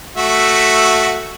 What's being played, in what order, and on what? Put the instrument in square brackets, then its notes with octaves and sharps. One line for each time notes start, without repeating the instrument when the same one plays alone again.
[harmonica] A3 F#4 E5